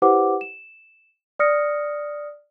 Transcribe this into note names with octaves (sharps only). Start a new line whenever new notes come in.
E4 G4 B4 C5 F#5 D6
E7
D5 D#6 F6 A#6 C#7